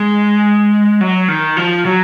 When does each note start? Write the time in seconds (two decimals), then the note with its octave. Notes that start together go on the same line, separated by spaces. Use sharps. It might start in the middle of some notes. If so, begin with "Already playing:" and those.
Already playing: G#3
1.01 F#3
1.28 D#3
1.57 F3
1.85 F#3